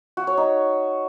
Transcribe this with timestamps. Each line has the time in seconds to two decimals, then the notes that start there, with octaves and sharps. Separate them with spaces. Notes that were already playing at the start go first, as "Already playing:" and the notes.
0.17 F#4
0.27 C#5
0.37 D#4